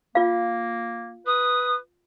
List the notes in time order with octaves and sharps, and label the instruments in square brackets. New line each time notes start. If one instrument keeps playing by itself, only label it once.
[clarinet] A#3 [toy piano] F4 F5
[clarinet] B4 [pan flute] D#6